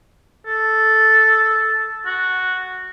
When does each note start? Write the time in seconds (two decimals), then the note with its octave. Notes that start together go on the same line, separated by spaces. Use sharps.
0.46 A4
2.06 F#4